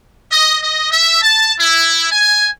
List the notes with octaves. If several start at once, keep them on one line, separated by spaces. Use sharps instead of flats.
D#5
D#5
E5
A5
E4
G#5